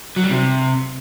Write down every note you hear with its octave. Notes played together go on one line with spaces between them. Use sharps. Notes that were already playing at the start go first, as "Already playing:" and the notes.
F#3
G3
C3